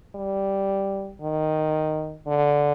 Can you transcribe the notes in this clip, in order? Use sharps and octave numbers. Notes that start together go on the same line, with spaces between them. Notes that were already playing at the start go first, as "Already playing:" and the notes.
G3
D#3
D3